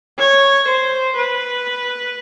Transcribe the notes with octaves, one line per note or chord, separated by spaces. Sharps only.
C#5
C5
B4